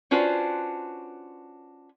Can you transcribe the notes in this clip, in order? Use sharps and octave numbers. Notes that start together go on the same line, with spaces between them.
C#4 D4 F4 F#4 B4 C5